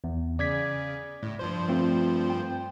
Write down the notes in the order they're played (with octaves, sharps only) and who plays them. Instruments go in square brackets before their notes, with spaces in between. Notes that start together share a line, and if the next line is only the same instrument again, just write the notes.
[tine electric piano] E2
[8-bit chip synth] C#3 [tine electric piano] D5 G#6 B6
[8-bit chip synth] A2
G2 F3 C5
[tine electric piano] A3 C4 F4
G5